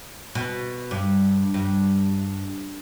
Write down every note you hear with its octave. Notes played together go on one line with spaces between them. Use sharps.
B2
G2
G2